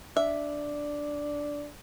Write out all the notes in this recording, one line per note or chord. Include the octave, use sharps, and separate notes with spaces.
D4 E5